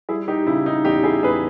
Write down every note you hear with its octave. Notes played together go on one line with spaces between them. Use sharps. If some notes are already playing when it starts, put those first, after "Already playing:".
G3 E4 G#4
D#4 G4
C#3 E4
D#4
E2 D#4 G4
E4 G#4
E2 G#4 B4